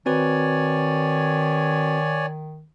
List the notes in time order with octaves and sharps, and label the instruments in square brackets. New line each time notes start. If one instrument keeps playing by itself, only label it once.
[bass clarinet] D#3 [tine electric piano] C4 F#4 B4 [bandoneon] C#5 D5 G#5